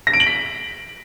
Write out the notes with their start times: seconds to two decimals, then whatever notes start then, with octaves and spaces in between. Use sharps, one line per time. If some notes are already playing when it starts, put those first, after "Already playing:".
0.07 A#6
0.13 D7
0.20 F#7
0.27 B6